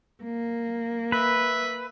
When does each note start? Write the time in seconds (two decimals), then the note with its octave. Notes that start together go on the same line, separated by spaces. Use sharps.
0.23 A#3
1.12 B4 E5